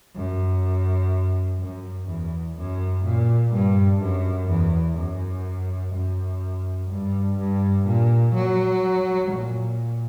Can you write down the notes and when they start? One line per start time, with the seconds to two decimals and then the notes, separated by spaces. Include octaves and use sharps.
0.16 F#2
1.60 F#2
2.08 E2
2.57 F#2
3.04 A#2
3.53 G2
4.01 F#2
4.49 E2
4.97 F#2
5.94 F#2
6.90 G2
7.39 G2
7.87 A#2
8.35 F#3
9.31 A#2